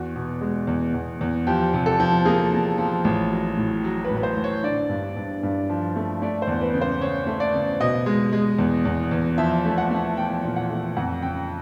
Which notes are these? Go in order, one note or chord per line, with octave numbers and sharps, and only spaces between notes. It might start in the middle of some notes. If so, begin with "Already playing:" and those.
Already playing: E2 F#4
B2
G#3
E2
E2
E2
F3 G4
C3
A4
F3
A#3 G#4
A#3
F3
A1
F#3
A2
F#3
B4
A2
B4
C5
A1
C#5
D3 D5
G2
G2
G2
F3
A3
A3 D5
C5
E2
B4
C#3
C5
C#3 C#5
A3
D5
C#3
B2 D#5
G#3
G#3
E2
E2
E2
F3 E5
A3
F#5
A3
F3 G5
A#2
F#5
A3
F2 F#5
C#3 G5